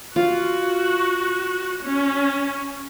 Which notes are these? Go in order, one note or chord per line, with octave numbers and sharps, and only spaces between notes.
F4 F#4
C#4